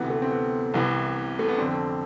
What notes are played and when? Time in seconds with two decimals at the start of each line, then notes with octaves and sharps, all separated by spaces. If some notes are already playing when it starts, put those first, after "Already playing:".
Already playing: D2 C3 E3 B3
0.10 A3
0.22 C4
0.31 B3
0.74 C2 C3 E3
1.39 A3
1.48 B3
1.58 F2 D3 C4